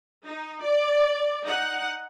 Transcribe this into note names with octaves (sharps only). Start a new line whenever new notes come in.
D#4
D5
D#4 F#5